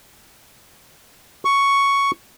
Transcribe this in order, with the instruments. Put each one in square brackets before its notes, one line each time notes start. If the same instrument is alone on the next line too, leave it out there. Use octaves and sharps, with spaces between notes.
[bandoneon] C#6